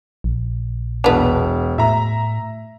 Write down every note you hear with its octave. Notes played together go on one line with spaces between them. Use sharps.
A#1
E1 B3 D4 F7
A2 E5 A#5